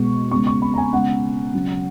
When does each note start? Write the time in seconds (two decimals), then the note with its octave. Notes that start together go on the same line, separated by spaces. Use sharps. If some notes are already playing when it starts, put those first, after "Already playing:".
Already playing: B2 G#3 B3 C#6
0.31 C#3 G#3 B3 C#6
0.47 C#6
0.62 B5
0.74 A#5
0.78 G#5
0.92 C#3 G#3 B3 F#5
1.54 C#3 F#3 C#4